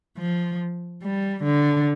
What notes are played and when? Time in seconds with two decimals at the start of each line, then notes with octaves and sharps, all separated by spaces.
0.18 F3
1.02 G3
1.44 D3